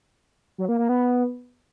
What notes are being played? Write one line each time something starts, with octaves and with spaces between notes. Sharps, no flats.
F#3
A#3
A#3
B3